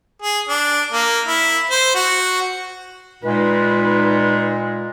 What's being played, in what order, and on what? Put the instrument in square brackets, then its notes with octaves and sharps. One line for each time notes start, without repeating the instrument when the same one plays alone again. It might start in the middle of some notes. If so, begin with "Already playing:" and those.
[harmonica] G#4
D4
A#3
E4
C5
F#4
[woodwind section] A#2 G#3 [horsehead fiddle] D#4 B4